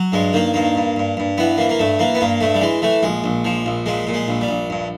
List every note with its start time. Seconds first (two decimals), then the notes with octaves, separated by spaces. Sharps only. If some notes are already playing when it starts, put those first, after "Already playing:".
Already playing: F#3
0.12 G2 G#3
0.33 D#3 A#3
0.54 G2 A#3
0.75 G2
0.96 G2
1.17 G2
1.38 E3 B3
1.58 E3 A#3
1.69 A#3
1.79 G2 A3
1.99 E3 A#3
2.15 B3
2.21 G2 A#3
2.41 G2 A3
2.55 G3
2.61 E3 G#3
2.82 E3 A3
3.03 A#1 G#3
3.24 A#1
3.45 F3
3.66 A#1
3.86 A#2 G#3
4.07 A#2
4.14 G#3
4.28 A#1
4.41 G3
4.49 A#1
4.70 G2